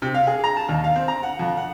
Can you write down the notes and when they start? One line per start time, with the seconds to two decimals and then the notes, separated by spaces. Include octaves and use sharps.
0.02 C3
0.14 F5
0.27 G#4
0.44 A#5
0.57 A5
0.69 D#2
0.84 F5
0.96 C4
1.08 A#5
1.23 F#5
1.39 F2
1.57 F#5